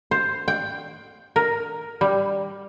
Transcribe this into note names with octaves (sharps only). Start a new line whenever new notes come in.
C5
G5
A#4
G3